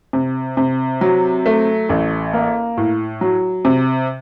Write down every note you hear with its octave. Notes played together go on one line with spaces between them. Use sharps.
C3
C3
F#3
A3
A1
A#3
A2
F#3
C3